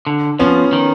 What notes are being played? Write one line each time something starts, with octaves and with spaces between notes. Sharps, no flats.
D3
F3 B3 C#4
D#3